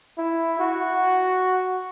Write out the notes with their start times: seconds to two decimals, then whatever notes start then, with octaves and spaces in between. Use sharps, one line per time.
0.18 E4
0.59 F#4